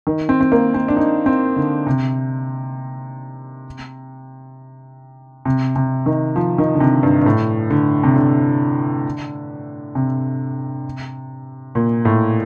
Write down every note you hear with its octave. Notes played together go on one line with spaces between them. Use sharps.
D#3
C4
C4
A#3
C4
D4
D#4
C4
D3
C3
C3
C3
D#3
F3
D#3
D3
C3
G2
G2
A2
D3
C3
D3
C3
A#2
A2